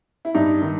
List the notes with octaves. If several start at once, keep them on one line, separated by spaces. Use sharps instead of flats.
E4
G2 D#4
D#3